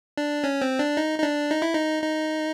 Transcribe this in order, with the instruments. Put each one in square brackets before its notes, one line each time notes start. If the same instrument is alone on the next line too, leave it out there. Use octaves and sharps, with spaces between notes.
[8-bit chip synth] D4
C#4
C4
D4
D#4
D#4
D4
D#4
E4
D#4
D#4